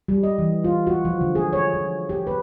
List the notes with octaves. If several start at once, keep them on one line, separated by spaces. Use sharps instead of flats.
G3
D#5
E3
F4
F#4
F3
D3
G#4
C#5
F3
G4
B4